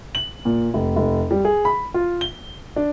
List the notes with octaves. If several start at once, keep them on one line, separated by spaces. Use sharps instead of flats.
F#7
A#2
F1
F1
G3
G#4
B5
F4
G7
D4